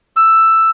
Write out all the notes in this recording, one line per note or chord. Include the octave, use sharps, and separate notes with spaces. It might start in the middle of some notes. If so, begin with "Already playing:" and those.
E6